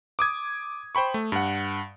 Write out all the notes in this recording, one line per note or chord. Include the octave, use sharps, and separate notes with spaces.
D6 D#6 G#6
C5 G5 B5 C#6
A3
G2 F#5